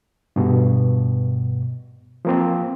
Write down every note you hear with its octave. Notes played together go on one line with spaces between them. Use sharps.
G2 B2
F3 A#3 C4